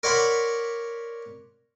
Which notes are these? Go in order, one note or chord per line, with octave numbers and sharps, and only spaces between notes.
A#4 C#5 D5 F#5 B5 C6